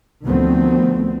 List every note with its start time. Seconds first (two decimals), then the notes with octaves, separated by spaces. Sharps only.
0.25 D2 D#3 F3 A3 B3 C4